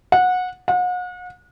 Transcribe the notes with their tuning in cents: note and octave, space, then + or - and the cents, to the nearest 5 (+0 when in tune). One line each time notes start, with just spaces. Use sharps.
F#5 -20
F#5 -40